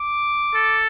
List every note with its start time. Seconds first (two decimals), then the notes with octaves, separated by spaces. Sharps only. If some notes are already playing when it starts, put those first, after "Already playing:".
Already playing: D6
0.55 A4